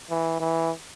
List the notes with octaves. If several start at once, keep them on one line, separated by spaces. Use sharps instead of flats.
E3
E3